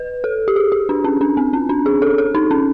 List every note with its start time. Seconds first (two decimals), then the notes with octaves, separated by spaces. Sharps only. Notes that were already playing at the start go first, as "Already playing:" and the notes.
Already playing: B4
0.24 A4
0.48 G4
0.56 G#4
0.72 G4
0.89 D4
1.04 C#4
1.21 D4
1.37 C4
1.53 C#4
1.69 D4
1.86 G#4
2.02 A4
2.18 A4
2.35 D#4
2.51 C#4